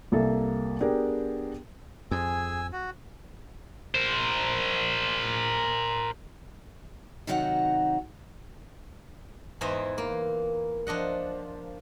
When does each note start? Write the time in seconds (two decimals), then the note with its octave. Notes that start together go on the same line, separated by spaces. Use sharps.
0.12 C2 A#3 A4 E5
0.80 B3 D4 G4 G#4 A#4 G5
2.11 F2 G#4 G#5 E6
2.72 F#4
3.95 A#4 C5
7.27 C3 D#3 F#3 D#4 F#4 F#5
9.61 E2 G#2 E3 E4 C5 D#5
9.98 A#3
10.87 F3 D4 D#5 F#5